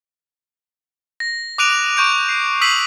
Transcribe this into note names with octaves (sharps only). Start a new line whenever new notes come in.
A#6
D6 D#6 F#6 D7 D#7 F7
C#6 G6 D7
C7
D#6 E6 B6 C7 D#7 F#7